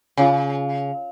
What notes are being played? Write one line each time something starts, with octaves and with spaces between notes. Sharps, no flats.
C#3 F4 G#4 C#5 F5 G#5